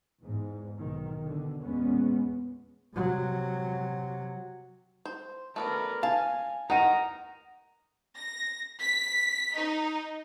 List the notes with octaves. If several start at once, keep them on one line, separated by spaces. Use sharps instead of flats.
E2 G#2
B1 D#3
B2 D3
E2 A#2 G#3 B3 C#4
C3 F#3
C5
A3 B3 D4 A#4 B4
F5 G#5 A5
D#3 D#4 A#4 F#5 A#5 D#7
A#6
B6
D#4